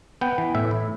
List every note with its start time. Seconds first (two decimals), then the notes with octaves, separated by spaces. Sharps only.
0.21 B3 G5
0.38 E3
0.55 A2 E5
0.71 E4